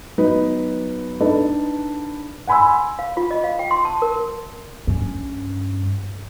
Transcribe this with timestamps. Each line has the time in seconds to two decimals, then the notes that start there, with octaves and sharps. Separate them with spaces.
0.18 F#3 B3 D#4 B4
1.20 D4 D#4 A4 B4 D5
2.47 F#5 G#5 B5 C6 E6
2.99 F5
3.17 F4
3.31 D#5
3.44 F5
3.59 G5
3.71 C6
3.85 A5
4.02 A#4
4.87 G2 C#4